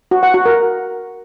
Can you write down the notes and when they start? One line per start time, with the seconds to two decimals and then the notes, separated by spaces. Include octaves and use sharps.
0.11 F#4
0.23 F#5
0.34 F#4
0.45 A#4